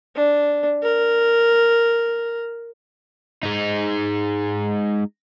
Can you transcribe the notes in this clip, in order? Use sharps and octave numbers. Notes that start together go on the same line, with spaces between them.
D4
A#4
G#3 D#4